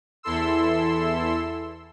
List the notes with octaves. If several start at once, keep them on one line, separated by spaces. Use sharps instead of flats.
E2 E4 A4 C6 E6